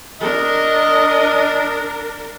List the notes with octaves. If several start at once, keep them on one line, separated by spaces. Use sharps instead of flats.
D4 A#4 D#5